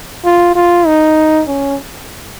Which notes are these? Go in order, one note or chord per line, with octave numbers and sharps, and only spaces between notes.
F4
F4
D#4
C#4